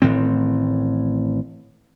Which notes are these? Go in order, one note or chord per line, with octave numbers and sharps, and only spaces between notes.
A1 A2 D#3 C4